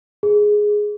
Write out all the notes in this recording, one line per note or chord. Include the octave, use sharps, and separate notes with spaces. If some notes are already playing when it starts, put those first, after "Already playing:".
G#4